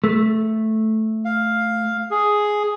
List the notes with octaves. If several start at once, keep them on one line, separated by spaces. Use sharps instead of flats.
A3
F5
G#4